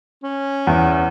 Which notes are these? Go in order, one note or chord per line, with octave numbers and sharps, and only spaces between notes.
C#4
E2